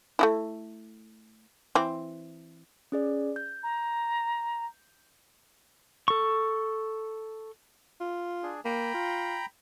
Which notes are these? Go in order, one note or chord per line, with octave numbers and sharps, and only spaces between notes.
A3 D#4 E4
E3 C4
C#4 G#4 D5
G6
A#5
A4 C#6
F4
D4 G#4
A#3 G5 A#5 B5
F4